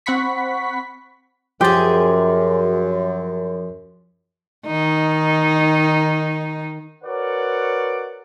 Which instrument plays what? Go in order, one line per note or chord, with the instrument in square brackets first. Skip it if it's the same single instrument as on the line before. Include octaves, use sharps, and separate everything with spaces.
[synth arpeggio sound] C4 F#5 B5 C#6 B6
[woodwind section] F#2 [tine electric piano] F3 C6 A6 [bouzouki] F#3 G#4 [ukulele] G4
[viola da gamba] D#3 D#4
[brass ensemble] F#4 A#4 B4 C#5 D5 F#5